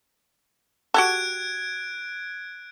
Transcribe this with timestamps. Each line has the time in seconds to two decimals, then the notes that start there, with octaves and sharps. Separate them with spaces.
0.94 F#4 G4 A4 F#6 G#6 D7